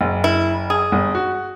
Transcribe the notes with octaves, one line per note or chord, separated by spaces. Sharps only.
F#1
E4
G#4
G1
F#4